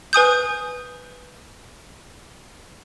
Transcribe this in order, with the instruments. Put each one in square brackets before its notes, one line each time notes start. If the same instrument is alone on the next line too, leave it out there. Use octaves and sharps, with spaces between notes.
[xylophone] B4 G#5 D#6 G6